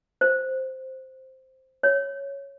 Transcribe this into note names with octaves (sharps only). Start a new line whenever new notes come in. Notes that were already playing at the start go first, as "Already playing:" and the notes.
C5
C#5